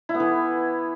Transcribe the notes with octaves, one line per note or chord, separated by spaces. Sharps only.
E4
B3
E3